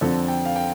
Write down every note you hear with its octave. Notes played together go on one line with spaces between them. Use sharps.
F2 D3 F3 C4 A4
G5
F5
G5